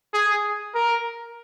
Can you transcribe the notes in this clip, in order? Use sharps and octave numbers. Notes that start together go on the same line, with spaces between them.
G#4
A#4